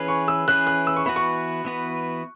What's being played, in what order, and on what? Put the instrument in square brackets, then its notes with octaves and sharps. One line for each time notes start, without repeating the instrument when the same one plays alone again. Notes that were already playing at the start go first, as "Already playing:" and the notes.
Already playing: [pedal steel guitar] E3 C#4 G#4 B4
[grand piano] C#6
E6
[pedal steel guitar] E3 C#4 G#4 B4 [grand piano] F#6
[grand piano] F#6
E6
C#6
[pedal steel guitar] E3 B3 F#4 B4 [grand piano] B5
[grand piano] C#6
[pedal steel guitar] E3 B3 F#4 B4